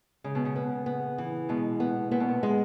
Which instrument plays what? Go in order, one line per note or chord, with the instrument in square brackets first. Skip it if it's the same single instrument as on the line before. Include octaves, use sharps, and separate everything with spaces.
[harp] C#3 [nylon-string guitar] G#3
[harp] B2
C#3
[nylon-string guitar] B3
B3
E3
[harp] B2 [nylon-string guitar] G#3
[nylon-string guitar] B3
[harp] A#2 [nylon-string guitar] B3
[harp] B2
A#2
[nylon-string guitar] G#3